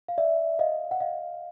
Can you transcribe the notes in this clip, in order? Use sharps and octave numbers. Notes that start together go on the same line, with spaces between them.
F5
D5 E5
D#5 F5
F#5
D#5 F5